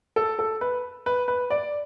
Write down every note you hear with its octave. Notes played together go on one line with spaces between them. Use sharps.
A4
A4
B4
B4
B4
D5